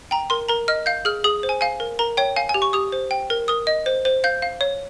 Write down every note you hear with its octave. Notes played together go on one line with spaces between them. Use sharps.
G5 A#5
A#4 C6
A#4 A#5
D#5 F6
F5 G6
G#4 F6
G#4 D#6
C5
G#5
F5 G#5
A#4
A#4 A#5
C#5 G5
F5 G#5
G#5
G4
C#6
G4 D#6
C5
G5
A#4
A#4 D#6
D#5
C5
C5
F5 G6
F5
C#5